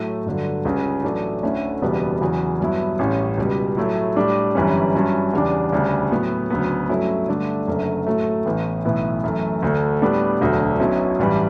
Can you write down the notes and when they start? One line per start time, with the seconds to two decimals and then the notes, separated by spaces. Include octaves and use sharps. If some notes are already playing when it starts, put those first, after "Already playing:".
Already playing: A2 F#3 A3
0.26 G1 G2 D3 F#3
0.65 C#2 C#3 G3 C#4
1.04 A1 A2 F#3 A3 D4
1.43 D2 D3 A3 C#4 E4
1.81 F#1 E2 B2 G3 B3
2.21 E2 C#3 F#3
2.60 G2 F#3 B3 E4
2.99 A1 A2 G3 C#4
3.38 C#2 B2 G3
3.77 A2 F#3 A3 E4
4.16 A2 G3 D4
4.55 G1 F#2 E3 G3 C#4
4.94 G2 F#3 C#4 E4
5.33 E2 C#3 G3 D4
5.73 D2 C#3 G3 D4
6.11 A2 F#3 B3
6.50 D2 C#3 F#3 B3
6.89 G2 F#3 A3 C#4 E4
7.28 G2 D3 A3 D4
7.67 F#1 F#2 D3 A3
8.07 A2 F#3 A3
8.45 A1 A2 E3 B3
8.85 B1 A2 E3 B3 E4
9.24 F#2 E3 A3
9.62 D2 D3 A3
10.02 A2 G3 B3 D4
10.40 E1 D2 D3 F#3
10.80 B1 B2 F#3 C#4 E4
11.19 A1 G2 E3 G3